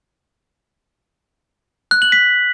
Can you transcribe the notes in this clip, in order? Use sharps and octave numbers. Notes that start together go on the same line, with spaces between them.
F#6
F#7
B6